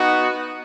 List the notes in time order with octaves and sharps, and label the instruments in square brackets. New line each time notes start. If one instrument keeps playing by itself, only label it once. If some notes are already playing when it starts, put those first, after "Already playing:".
Already playing: [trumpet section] B3 D#4 F#4